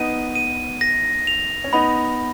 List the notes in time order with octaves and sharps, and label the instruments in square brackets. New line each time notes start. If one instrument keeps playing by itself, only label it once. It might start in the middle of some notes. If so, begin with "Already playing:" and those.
Already playing: [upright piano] B3 D#4 [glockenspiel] D#7
[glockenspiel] D#7
A#6
F7
[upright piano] C#4
[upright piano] B3 D#4 [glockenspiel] B5